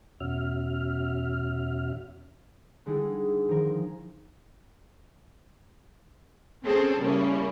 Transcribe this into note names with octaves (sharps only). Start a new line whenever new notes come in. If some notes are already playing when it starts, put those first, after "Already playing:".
E2 B2 C#4 F#4 E5 F6
D3 G3 G#3 D#4 E4 G#4
D#3 F3 G#4 A#4
C4 C#4 G#4 A4 C5
C#3 G3 A#3 C#4 E4